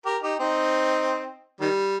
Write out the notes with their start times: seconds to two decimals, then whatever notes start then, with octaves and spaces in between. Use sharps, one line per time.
0.06 G4 A#4
0.23 D#4 G4
0.40 C4 D#4
1.61 D#3 G3